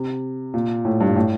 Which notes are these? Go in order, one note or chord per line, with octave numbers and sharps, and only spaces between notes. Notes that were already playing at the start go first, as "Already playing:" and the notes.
Already playing: C3
A#2
A2
G2
A2